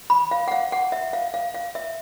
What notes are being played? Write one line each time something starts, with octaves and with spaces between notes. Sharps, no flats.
B5
F5
F#5
F5
F#5
E5
F5
F5
F5
E5